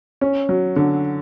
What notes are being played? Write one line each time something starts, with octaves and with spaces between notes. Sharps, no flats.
C#4
F#3
D3